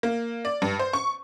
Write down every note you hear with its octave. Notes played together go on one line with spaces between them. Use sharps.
A#3
D5
G2
C5
C#6